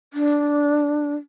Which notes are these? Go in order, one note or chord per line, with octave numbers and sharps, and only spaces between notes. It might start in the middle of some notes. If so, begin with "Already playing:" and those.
D4